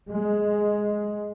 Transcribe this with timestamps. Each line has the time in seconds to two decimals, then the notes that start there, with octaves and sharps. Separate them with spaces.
0.10 G#3